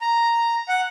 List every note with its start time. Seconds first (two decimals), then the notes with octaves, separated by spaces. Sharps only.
0.01 A#5
0.69 F#5